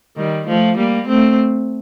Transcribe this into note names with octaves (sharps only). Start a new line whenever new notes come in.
D#3 G3
F3 A3
G3 A#3
A3 C4